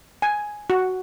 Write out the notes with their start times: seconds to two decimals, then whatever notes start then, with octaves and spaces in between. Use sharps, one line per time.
0.22 G#5
0.70 F#4